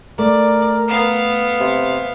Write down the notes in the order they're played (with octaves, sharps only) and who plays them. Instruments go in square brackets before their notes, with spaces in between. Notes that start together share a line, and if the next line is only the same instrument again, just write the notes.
[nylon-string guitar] A3 [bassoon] A#4 [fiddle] D5
[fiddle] B3 F5
[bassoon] C3